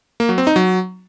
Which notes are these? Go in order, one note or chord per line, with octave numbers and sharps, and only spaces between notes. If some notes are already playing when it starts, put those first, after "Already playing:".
A#3
F#3
C4
D#4
F#3